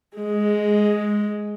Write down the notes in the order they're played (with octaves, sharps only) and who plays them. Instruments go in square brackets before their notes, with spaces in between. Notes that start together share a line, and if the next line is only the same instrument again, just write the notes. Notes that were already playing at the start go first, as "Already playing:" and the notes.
[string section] G#3